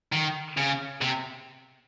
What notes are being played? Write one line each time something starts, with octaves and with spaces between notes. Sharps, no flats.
D#3
C#3
C3